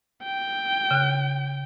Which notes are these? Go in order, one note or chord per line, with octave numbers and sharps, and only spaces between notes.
G5
C#3 F#6